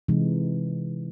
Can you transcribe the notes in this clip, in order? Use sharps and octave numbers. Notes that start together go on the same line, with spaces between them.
C3 E3 G#3 D#4